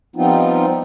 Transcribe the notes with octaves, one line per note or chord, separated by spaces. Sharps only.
F3 G3 B3 C4 D#4 F4